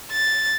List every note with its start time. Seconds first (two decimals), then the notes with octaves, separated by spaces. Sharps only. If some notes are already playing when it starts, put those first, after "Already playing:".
0.12 A6